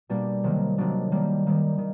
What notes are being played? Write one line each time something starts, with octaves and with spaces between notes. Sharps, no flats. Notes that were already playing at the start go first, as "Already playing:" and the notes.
B2 G3 A#3 D4
C3 D#3 F#3 A#3
C3 D#3 F#3 A#3 D4
D#3 G3 A#3
D#3 G3 A#3
D#3